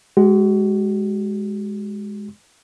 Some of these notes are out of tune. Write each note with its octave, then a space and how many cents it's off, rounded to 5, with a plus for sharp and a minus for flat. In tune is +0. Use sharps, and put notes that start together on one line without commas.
G#3 +0 F#4 +35